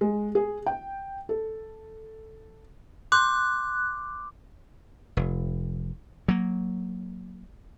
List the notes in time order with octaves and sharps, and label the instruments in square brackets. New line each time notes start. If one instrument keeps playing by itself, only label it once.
[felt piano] G#3
G#4
G5
A4
[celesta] C6 G6 [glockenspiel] D6 [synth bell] F#6
[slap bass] F1
F#3 A#3